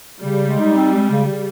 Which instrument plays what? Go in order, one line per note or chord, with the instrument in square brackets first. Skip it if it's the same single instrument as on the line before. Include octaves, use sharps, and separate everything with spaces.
[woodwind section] C#3 [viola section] G3
[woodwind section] G#3
D#4
C4
G#3
C#3
C#3